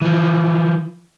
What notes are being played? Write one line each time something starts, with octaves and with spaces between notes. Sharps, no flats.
E3 F3